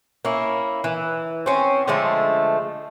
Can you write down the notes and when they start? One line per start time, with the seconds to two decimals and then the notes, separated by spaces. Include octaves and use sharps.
0.25 A#3 C#4 E4
0.84 E3
1.46 C4 C#4
1.88 D3 F3 G#3 A3